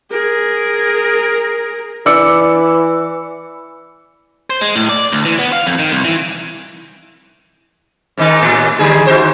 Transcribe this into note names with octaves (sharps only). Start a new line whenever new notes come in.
G#4 A#4
E3 D5 E6 C#7
C5
G#3
A2
D5
D2
E3
B3
F5
F2
D#3
C2
E3
G#2 D#3 D#4
D#2 A2
D3 G3 G#4
D#4 F#4 C5